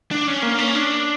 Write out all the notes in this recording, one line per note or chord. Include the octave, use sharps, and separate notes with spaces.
D4
C#4
A#3
C#4
D4